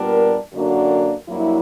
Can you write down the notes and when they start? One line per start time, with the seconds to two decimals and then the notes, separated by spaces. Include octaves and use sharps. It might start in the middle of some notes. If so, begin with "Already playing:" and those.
Already playing: A#2 G3 B3 D4 A#4
0.53 F#2 D3 A#3 D4 F#4
1.29 G2 F#3 A#3 E4